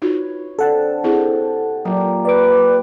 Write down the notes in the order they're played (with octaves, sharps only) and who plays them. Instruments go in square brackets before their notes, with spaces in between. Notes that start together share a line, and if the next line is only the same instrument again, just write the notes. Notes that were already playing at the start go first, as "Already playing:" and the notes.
[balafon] D#4 F4 F#4 [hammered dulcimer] B4 C#5
[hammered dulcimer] D3 C4 [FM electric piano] A4 F#5 A5
[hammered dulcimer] C3 [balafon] C4 E4 G#4
[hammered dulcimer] A#2 G4 A#4 [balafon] F#3
[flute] B4 [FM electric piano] D5 D6